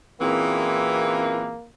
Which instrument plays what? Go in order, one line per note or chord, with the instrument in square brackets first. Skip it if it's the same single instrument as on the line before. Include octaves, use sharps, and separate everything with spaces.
[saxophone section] F#2 A#2 E3 [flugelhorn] A#3 [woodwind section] C4 G#4